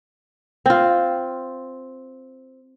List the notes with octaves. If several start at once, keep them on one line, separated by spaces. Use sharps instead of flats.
C4 F4